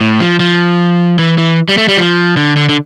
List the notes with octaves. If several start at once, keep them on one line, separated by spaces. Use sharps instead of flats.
A2
F3
F3
E3
E3
G3
A3
G3
F3
D3
D3
D3